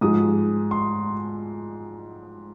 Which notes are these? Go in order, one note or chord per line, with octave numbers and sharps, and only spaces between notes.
G#2 F3 G#3 D#6
C6